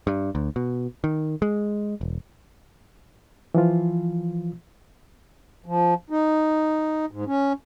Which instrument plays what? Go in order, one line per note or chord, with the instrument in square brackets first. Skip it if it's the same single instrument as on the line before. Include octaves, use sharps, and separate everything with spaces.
[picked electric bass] G2
D2
B2
D#3
G#3
E1
[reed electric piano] E3 F3 F4
[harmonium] F3
D#4
G#2
C#4